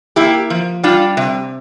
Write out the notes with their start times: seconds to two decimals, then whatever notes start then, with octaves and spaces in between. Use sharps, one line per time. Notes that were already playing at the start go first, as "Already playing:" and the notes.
0.16 A#3 E4 G4
0.50 F3
0.83 G3 D4 F4
1.17 C3